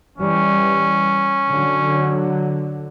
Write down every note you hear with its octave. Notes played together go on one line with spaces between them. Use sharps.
E3 G3 C#4
D3 F#3